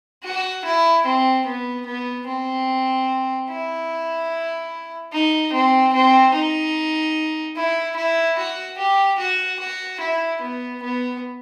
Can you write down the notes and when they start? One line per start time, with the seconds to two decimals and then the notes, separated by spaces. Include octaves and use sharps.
0.24 F#4
0.65 E4
1.05 C4
1.46 B3
1.86 B3
2.27 C4
3.49 E4
5.12 D#4
5.53 C4
5.93 C4
6.34 D#4
7.56 E4
7.96 E4
8.38 F#4
8.78 G4
9.19 F#4
9.60 F#4
10.00 E4
10.41 B3
10.82 B3